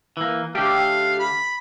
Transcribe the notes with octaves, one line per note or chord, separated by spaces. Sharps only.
E3 A#3
D3 A3 G4 F5
B5